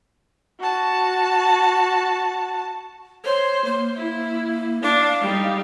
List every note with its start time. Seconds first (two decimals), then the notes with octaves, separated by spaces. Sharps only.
0.60 F#4 A5
3.25 C5 C#5
3.65 A#3
3.96 E4
4.82 D4 F5
5.21 G3 D#4